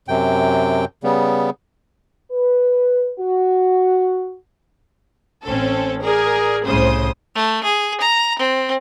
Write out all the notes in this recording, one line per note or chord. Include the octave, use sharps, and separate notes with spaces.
F#2 C3 G5
C#3 G3 B3
B4
F#4
A1 C4 C#4 A4
G#4 A#4 D5
C2 A2 C#3 C5 D#6
A3
G#4
A#5
C4